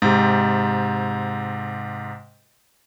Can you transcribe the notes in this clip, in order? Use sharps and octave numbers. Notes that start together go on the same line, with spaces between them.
G#2 C3